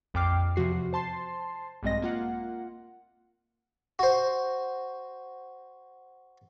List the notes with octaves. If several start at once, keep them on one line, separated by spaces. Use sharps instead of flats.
A#1 F2 G5 D6 F6 C7
E2 C3 F3 F#4 C7
C5 A5 C6 C7
A#1 G2 G#3 C4 D#5 A#6
A#3 F4 F#5
F#4 C5